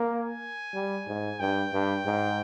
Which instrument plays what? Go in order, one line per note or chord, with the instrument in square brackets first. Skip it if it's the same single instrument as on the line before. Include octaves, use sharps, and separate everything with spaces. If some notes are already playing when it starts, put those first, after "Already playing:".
Already playing: [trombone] A#3
[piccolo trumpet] G#5
[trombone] G3
G#2
[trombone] G2 [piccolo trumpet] G5
[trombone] G2
G#2